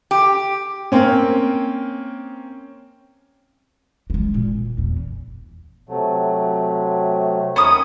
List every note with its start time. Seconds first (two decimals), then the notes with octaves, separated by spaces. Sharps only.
0.11 G4
0.92 A#3 C4 C#4
4.10 G#3 A#3
4.34 A#2
4.78 E2 E3
5.89 C3 F#3 A3
7.56 D#2 C#4 A#4 B5 D#6